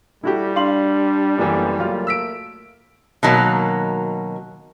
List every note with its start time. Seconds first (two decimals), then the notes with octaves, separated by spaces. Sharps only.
0.23 G3 E4 F#4 G4 A4
0.56 D4 F5 C6 F#7
1.38 F#1 F#2 E3 A#3 B3 A4
1.78 F#3 A3 A#3 F4 F6
2.07 E6 B6 D7
3.23 B2 D#3 F#3 A#3